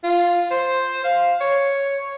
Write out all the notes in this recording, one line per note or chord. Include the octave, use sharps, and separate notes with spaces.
F4
C5
F5
C#5